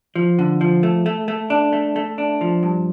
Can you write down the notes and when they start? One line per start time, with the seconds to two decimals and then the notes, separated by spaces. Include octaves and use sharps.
0.16 F3
0.39 D3
0.61 F3
0.83 A3
1.06 A3
1.28 A3
1.50 D4
1.73 A3
1.96 A3
2.18 D4
2.41 F3
2.63 G2